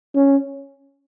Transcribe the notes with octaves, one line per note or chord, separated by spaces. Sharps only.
C#4